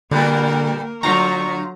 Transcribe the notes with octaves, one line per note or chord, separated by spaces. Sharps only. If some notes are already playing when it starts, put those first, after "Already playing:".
A#2 D3 G3 A#3 B3 A#4
D3 F#3 A3 F4 A#5 C#6